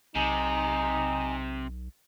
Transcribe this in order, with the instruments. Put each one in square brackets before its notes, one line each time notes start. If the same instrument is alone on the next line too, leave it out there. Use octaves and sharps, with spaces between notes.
[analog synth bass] B1 [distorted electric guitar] C3 [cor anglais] D#4 [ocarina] G#5